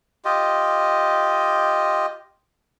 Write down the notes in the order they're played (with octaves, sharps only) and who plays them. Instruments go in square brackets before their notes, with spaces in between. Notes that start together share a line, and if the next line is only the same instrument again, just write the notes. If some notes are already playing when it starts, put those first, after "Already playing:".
[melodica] F4 G4 D#5